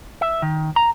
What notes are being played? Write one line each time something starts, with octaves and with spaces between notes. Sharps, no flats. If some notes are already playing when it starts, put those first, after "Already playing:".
E5
D#3
A#5